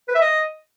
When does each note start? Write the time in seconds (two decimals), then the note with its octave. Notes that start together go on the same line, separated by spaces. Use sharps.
0.08 B4
0.15 E5
0.21 D#5